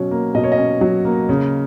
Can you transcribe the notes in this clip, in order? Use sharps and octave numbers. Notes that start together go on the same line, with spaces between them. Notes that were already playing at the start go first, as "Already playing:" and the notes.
Already playing: B2 F#3 C#4
A#3
B2 D#5
C#5
D#5
C#4
F#3
A#3
C#3